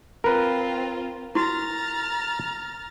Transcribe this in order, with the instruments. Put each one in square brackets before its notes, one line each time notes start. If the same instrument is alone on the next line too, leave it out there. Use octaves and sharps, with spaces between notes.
[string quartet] C4 F4 [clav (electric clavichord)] A#4 B4
[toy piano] E4 F#4 [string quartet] A#5 F6 A6